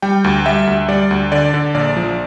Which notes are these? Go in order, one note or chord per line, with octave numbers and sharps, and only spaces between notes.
G3 G5
D2
G3 E5
D2
G3 D5
D2
D3 D5
D3
A#1 D5
F3